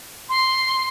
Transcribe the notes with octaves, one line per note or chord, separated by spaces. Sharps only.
C6